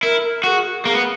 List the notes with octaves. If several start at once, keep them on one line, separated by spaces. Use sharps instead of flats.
E4 A#4
A#4
F#4 G#4 A#4
A#3 G#4
B3